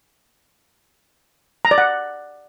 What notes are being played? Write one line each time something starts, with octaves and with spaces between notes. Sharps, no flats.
A#5
D5
F#5